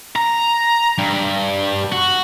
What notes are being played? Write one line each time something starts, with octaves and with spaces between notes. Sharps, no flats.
A#5
G2
F#4